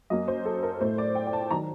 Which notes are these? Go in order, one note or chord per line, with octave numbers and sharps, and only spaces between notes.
F#2 F#3 A#3 D#5
C5
A4
A#4
A2 A3 C5
D5
G5
G5
A5
D#3 F#3 A#5